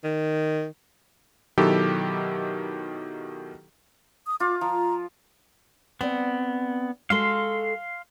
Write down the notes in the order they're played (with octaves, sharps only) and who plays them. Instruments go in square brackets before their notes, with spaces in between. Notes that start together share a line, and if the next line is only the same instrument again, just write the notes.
[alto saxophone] D#3
[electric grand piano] B2 D#3 F#3 E4 G4 A4
[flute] D#6
[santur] F4 [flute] D6
[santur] F3 [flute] A#5
[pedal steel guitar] B3 [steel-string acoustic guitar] C4 D5
[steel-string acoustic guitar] G#3 F#4 A4 [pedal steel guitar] F5 C6